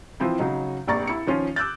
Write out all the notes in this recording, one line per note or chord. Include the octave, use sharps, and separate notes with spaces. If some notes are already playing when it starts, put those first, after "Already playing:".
E3 F3 C4 E4
C#3 F#3 D#4
F1 A#1 D5 A#5 C#6 A6
E4 C#7
D#3 F3 C#4 F4
D6 E6 F#6 G6 A6